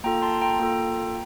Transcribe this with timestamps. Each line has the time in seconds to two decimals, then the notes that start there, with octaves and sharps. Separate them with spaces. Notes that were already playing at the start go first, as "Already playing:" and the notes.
0.04 A#3 F4 A4 G5 A#5
0.22 A5 C6
0.41 G5 A#5
0.60 A#3 F4 A4